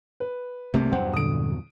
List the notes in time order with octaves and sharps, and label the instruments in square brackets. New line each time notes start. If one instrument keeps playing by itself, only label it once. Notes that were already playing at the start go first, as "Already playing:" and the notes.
[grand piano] B4
[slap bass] C2 A3 A#3 [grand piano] C3
[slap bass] E2 G2 F#3 [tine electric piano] C5 G5 [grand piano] F#5
[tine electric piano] A#2 D3 [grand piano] D#6 D7